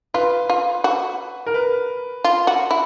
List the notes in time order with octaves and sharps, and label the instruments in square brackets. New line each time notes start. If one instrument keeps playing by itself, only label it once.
[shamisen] F4 [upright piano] B4
[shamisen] F4
F#4
[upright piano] A#4
B4
[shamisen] F4
F#4
E4